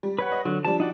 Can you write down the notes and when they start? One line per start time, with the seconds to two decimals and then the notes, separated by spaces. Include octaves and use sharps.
0.03 G3
0.19 B4 C#5 F#5
0.32 D#5
0.45 D3 F#3
0.65 F3 G3 D4 A5
0.80 D#4 F#4 D5